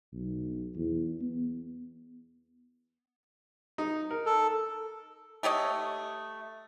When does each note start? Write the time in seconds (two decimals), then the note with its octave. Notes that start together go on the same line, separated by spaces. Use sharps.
0.13 B1
0.76 E2
1.21 B3
3.78 D#4
4.11 A#4
4.26 A4
5.43 A3 G4 C#5 D#5